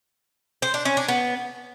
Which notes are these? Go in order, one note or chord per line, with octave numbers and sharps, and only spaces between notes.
C5
D4
C#4
D4
B3